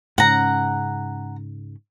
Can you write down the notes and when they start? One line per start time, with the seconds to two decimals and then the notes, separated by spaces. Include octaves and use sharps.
0.18 G#2 C#3 C#4 F#5 A#5